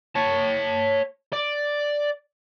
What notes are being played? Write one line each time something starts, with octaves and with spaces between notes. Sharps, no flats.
C#5 A5
D5